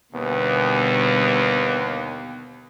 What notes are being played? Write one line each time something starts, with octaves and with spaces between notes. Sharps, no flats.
D#2 B2 D3 G3 B3